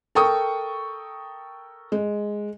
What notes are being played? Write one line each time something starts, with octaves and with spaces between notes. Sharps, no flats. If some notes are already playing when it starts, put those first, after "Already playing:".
A4 A#4 G5 C#6 D#6
G#3